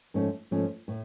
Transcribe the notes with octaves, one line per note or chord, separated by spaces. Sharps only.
G#2 F3 A3 C#4
G#2 F3 A3 C#4
A2